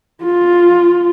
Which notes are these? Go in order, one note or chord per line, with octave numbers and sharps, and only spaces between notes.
F4